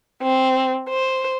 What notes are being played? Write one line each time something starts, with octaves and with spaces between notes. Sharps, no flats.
C4
C5